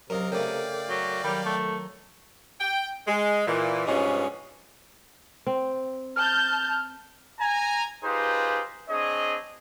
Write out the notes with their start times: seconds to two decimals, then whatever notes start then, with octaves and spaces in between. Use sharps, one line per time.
0.10 F#2 C3 A#4 D#5 F5
0.32 C#3 A3 A4 A#4 D5 F5 G5
0.89 F#3
1.24 D#3 F#3 G3 A#5
1.46 A3
2.60 G5
3.07 G#3
3.46 A#2 E3
3.87 G2 B2 F3 G#3 C#4 D#4
5.47 C4
6.16 A5 F6 G6
7.39 G#5 A#5
8.04 D#4 F4 G4 G#4 B4 C5
8.89 C4 D4 G#4 C#5 D#5